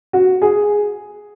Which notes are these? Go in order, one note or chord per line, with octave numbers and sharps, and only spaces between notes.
F#4
G#4